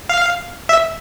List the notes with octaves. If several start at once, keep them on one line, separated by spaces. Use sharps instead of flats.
F5
E5